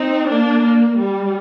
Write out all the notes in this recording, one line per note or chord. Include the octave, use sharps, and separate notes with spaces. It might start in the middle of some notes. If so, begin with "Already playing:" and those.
Already playing: C4 D#4
A#3 D4
A#3
G3